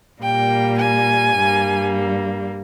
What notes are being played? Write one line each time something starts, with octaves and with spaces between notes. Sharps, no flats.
A#2 G3 A#3 G5
G#5
G2 G3 A#3